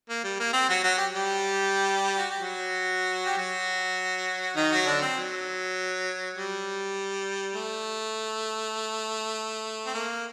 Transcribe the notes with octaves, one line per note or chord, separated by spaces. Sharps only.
A#3
G3
A#3
C4
F#3 F#4
F#3 F#4
G4
G3 G4
F#4
G4
F#3 F#4
G4
F#3 F#4
D#3 D#4
F#3 F#4
D3 D4
C4
F#3
G3
A3
C4
A#3